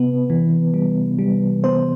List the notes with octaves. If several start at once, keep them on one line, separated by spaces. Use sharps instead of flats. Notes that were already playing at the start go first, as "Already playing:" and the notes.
Already playing: C3 B3 B4
E3
G3
G3
B3 C5